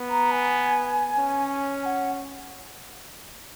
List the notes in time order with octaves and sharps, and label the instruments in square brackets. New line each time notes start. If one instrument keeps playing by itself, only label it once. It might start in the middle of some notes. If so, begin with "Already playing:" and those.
Already playing: [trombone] B3
[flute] A#5
G#5
[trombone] C#4
[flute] G#5
F#5